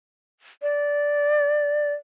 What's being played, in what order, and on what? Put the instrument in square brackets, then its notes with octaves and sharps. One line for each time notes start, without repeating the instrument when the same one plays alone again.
[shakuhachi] D5